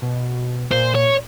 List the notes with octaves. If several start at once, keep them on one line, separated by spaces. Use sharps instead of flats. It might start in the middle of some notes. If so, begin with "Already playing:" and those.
B2
A#2 C5
C#5